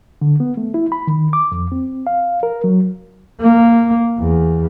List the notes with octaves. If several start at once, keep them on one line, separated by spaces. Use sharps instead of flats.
D3
B3
A3
E4
B5
D#3
D6
F2
C4
F5
A#4
F#3
A#3
E2